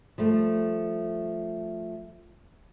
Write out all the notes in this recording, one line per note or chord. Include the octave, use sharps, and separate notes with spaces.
F3 G3 A3